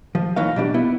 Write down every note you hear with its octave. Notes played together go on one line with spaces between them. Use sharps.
F3
B1 E3 F#3 D#4 F5
B2 G3 D4
B3 E4